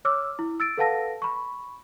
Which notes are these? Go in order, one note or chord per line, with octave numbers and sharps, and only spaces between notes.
C#5 D6 E6 F6
E4
E6 A6 D7
A4 B4 F5 F#5 A5 A#6
B5 C#6